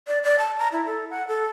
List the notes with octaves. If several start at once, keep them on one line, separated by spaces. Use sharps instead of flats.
D5
D5
A5
A#5
E4
A4
F#5
A4